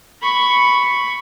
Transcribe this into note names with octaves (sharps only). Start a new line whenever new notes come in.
B5 C#6